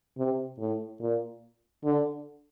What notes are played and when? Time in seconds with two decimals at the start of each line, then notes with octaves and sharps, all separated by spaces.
0.18 C3
0.59 A2
1.01 A#2
1.84 D3